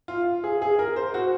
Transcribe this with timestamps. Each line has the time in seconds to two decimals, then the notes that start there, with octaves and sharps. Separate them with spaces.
0.08 F4
0.44 G#4
0.62 G#4
0.79 A#4
0.96 C5
1.14 F#4